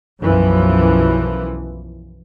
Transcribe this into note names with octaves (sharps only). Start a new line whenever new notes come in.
B1 F#2 E3 F3